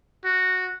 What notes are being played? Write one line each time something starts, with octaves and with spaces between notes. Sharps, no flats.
F#4